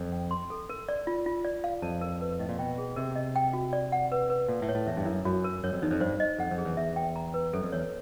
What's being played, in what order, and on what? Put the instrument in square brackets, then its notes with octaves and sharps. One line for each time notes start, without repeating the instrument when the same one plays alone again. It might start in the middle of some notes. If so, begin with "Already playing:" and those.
Already playing: [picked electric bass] F2
[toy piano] G5
C6
A4
A#4
D5
F4
F4
D5
F5
[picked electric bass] F2 [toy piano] A5
[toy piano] A#4
B4
[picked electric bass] A2 [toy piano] D#5
[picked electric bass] A#2
[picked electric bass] B2 [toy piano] G5
[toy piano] G#4
[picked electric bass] C3 [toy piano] A#4
[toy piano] D#5
G5
F#4
D5
F#5
B4
B4
[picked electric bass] A#2 [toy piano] A4
[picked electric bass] A2
[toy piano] C#5
[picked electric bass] A2
[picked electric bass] E2 [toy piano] E5
[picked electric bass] G2
[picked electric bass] F#2 [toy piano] E4
[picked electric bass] F#2 [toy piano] F#4
[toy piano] A#4
[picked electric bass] F#2 [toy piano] C#5
[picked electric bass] F2
[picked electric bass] E2 [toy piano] D#4
[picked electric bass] F2
[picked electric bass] G2 [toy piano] C5
[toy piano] D#5
[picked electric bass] F2 [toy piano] F#5
[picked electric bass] F2
[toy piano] G#4
[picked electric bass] E2
[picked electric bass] E2 [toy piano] E5
[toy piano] G5
A#5
B4
[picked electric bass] F#2 [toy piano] A4
[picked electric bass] F2
[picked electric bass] E2 [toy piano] C#5